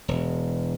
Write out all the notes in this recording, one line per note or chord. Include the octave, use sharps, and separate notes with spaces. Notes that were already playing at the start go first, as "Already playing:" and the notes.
E1